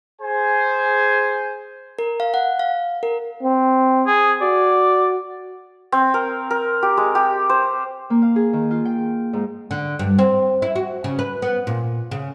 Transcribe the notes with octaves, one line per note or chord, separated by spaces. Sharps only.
G#4 C5 G#5
A#4
F5
F#5
F5
A#4
C4
G#4
F#4 D5
C4
A#4
A#4
G4
G#3
G4
C5
A#3
F5
G#4
D#3
F4
G5
G#2
D3
G2
C4
E4
F#4
C#3
B4
B3
A#2
C#3